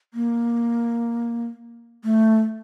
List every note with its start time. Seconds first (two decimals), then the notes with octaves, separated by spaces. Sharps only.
0.14 A#3
2.04 A3